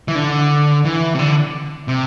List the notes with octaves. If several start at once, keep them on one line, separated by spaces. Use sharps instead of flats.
E3
D3
E3
C3
D3
C3